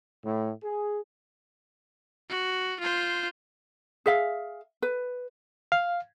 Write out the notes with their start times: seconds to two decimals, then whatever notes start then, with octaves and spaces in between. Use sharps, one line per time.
0.25 A2
0.64 G#4
2.30 F#4
2.80 F4 C5
4.06 G#4 E5 F5
4.82 B4
5.72 F5